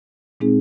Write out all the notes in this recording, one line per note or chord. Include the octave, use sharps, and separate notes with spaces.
A#2 G#3 C4 D#4 G#4